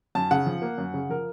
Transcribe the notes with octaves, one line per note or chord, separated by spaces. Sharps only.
F#2 A5
C#3 F#5
F3
A#3
F#2
C#3
F3 A#4